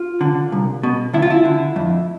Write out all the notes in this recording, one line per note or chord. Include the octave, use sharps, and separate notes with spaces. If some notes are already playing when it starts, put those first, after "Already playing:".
Already playing: F4
D3
C2
B2
D2 E4
F4
E4
D3
F2